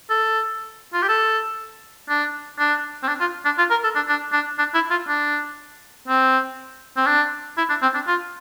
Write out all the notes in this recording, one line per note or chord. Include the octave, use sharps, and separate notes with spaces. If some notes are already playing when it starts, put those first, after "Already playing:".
A4
F4
G4
A4
D4
D4
C4
D4
F4
D4
F4
A#4
A4
D4
D4
D4
D4
E4
F4
D4
C4
C4
D4
E4
D4
C4
D4
F4